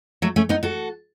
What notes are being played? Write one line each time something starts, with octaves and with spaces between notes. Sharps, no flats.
F#3 A3
A3 C#4
B3 D#4
F#4 A4